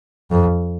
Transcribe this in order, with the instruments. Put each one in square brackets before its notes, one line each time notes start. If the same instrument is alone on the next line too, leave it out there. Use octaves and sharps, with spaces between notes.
[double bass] F2